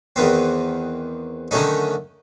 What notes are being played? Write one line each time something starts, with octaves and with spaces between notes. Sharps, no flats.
E2 D#3 B3 C4
D3 D#3 F#3 A3 C#4 D#4